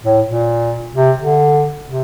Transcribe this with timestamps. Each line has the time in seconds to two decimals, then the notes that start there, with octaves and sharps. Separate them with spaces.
0.03 A2
0.26 A#2
0.95 C3
1.18 D3
1.87 C3